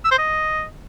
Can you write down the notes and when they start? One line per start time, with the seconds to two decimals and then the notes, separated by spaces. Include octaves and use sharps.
0.04 E6
0.11 C5
0.18 D#5